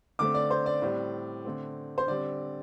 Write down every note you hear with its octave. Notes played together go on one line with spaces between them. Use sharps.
D3 A3 C4 D6
D5
C5
D5
A2 G3 C4
D3 A3 C4
C5
D3 G3 C4 D5